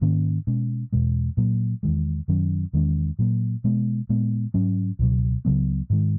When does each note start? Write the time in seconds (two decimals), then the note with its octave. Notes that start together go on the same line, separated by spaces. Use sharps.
0.01 G#2 D#3 A#3 C#4
0.47 B2 G#3 C#4
0.92 E2 B2 G#3
1.37 A#2 F#3 A#3
1.83 E2 D#3 G#3
2.28 F#2 D#3 F#3 C#4
2.73 E2 D#3 G#3 C#4
3.19 A#2 F#3 A#3
3.64 B2 G#3 B3
4.09 A#2 G#3 B3
4.54 G#2 F#3 C#4
4.99 C#2 B2 F#3
5.45 C#2 C#3 F#3 B3
5.90 G#2 D#3 G#3